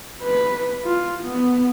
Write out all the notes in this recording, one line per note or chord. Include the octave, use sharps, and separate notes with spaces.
B4
F4
B3